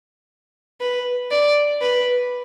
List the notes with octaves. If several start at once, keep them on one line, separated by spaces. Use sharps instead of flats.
B4
D5
B4